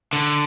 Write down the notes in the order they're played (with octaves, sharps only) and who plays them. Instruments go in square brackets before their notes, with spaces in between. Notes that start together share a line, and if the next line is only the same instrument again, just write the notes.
[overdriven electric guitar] D3